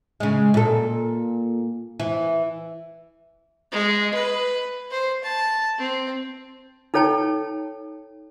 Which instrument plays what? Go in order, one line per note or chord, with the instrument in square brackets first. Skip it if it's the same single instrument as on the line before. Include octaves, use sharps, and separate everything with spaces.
[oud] C#3 G#3
A#2 A4
E3
[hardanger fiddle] G#3
B4
C5
A5
C4
[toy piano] D#4 A4 C#5 G5 A5